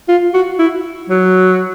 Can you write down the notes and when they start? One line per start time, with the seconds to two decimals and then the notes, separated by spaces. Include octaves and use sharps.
0.08 F4
0.34 F#4
0.59 E4
1.10 F#3